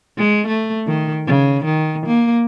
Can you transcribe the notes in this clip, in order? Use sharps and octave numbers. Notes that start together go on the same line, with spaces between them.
G#3
A3
D#3
C#3
D#3
A#3